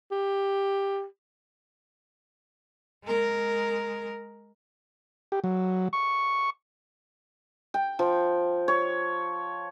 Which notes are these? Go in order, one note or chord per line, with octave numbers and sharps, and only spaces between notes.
G4
G#3 A#4
G4
F#3
C#6
G5
F3
C#5